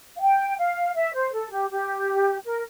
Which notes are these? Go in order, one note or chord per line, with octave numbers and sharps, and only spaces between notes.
F5
G5
F5
E5
C5
A4
G4
G4
A#4